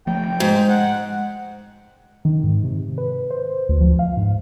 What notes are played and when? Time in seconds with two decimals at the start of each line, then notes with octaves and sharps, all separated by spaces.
0.07 F3 A3 G5
0.40 G#2 G#3
0.69 F#5
2.25 D#3
2.43 G#2
2.64 C3
2.98 B4
3.30 C5
3.69 D2
3.81 F3
3.99 F5
4.17 G#2